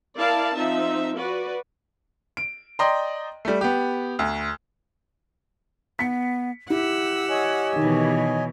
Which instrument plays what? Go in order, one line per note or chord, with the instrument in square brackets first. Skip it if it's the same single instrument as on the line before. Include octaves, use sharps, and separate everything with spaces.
[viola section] E4 A#4 D5 F5 A5
F3 C4 D#4 E5
F#4 B4 D5
[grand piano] D7
D5 D#5 G5 A#5 C6
G3 A3
B3 G4
D2
[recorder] B3 [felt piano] B6 C#7
[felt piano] E4 [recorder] G4 [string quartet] F#5 E6
[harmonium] C#5 D#5 G#5
[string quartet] B2 E3 [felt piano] D#3